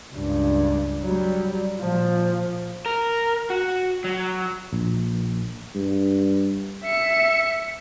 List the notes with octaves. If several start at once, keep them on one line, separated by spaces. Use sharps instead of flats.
C#2 G2
F#3 G3
A#2 F3
A#4
F#4
F#3
A#1
G2
E5 C#7